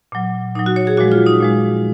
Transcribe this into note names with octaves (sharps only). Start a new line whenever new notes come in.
A#2 F#3
A#2 F#3 D#4
F#4
C#5
G#4
A#2 F3 G#3 F#4
F4
D#4
A#2 F3 G#3